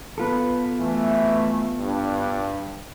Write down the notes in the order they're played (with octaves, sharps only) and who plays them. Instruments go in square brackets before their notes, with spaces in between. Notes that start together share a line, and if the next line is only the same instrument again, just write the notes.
[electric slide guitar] B3 F4 A4 [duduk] B4
[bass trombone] E3 [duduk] A3
[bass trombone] G2 [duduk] D4